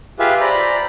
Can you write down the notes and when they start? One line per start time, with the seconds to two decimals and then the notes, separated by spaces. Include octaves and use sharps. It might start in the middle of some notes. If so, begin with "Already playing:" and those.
0.19 F4 G4 G#4 B4 E5 F5
0.41 C5 D5 A#5 B5